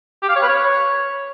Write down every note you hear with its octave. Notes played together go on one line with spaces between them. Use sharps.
G4
F5
C#5
B4
C#5